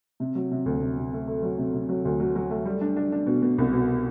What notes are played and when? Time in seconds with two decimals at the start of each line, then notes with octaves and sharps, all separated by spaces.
0.20 C3
0.35 F#3
0.51 C3
0.66 D2
0.82 C3
0.98 C3
1.13 A3
1.27 A3
1.43 F#3
1.58 C3
1.73 C3
1.89 F#3
2.05 D2
2.20 F#3
2.36 F#3
2.50 A3
2.65 G3
2.81 D4
2.96 D4
3.12 D4
3.27 B2
3.42 B2
3.58 C2
3.73 B2